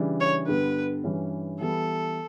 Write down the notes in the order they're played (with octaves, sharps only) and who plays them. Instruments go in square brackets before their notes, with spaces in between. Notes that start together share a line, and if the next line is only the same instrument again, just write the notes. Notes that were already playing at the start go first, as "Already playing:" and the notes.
Already playing: [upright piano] C#3 E3 G3 D4
[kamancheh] C#5
[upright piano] G2 D3 G3 B3 [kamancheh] B4
[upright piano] G2 E3 G3 C#4
[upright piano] E3 G3 B3 [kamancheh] A4